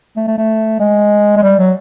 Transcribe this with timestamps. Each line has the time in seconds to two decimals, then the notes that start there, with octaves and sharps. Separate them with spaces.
0.17 A3
0.28 A3
0.38 A3
0.80 G#3
1.37 G#3
1.43 G3
1.59 F#3